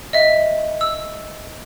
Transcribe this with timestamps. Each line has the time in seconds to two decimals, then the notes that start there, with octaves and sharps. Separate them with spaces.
0.13 D#5 E5
0.81 E6